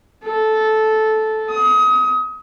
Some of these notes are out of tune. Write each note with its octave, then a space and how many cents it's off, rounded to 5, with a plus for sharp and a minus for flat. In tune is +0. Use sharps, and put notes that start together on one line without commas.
A4 -10
D#6 +30